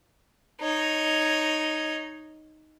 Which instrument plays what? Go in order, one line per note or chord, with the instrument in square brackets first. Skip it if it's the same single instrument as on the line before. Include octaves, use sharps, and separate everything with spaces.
[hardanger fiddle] D#4 C#5